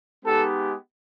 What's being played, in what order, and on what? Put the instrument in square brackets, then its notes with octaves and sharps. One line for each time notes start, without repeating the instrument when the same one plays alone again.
[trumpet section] G#3 B3 D#4 G4 A4